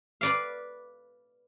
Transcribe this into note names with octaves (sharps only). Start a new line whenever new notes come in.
B4 D5 F5